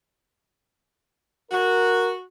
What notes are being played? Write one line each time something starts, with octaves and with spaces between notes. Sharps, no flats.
F#4 A#4